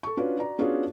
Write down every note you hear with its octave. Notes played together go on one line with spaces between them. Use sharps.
A4 C#6
C#4 D4 F4 F#4 B4
F#4 D5 A#5
B3 C#4 D4 F4 F#4 G#4